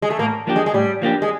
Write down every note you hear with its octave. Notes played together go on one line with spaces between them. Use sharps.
G#3
A3
A2 A#3
F3 A#3 D4 G4
G#3
G#3
A2 G3
F3 A#3 D4 G4
G#3